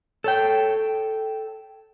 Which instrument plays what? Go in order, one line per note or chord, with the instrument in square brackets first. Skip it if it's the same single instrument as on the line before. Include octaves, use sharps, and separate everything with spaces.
[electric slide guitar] A4 C#5 G5